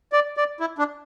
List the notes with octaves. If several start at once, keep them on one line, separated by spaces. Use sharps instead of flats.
D5
D5
E4
D4